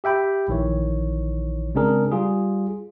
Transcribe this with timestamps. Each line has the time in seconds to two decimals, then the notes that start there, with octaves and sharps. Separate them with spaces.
0.04 G4 E5 G5 B5
0.48 A#1 D#3 E3 C#5
1.75 C#3 G#3 C4 D4 G#4 A#4
2.12 G3 F4 G#4